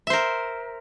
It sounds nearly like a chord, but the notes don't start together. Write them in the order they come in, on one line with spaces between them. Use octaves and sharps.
E5 C5 A#4